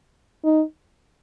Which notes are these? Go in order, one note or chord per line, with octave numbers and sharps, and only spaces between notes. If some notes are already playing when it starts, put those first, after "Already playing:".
D#4